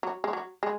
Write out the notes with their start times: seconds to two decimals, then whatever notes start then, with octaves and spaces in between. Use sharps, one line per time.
0.03 F#3
0.24 G#3
0.33 F#3
0.63 G#3